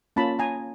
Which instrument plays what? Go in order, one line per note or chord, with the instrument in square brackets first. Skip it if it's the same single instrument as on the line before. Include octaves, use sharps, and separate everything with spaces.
[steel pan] A#3 C#4 F4 A5 B5
G#5 A#5